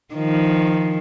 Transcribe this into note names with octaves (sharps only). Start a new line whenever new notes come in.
D#3 F3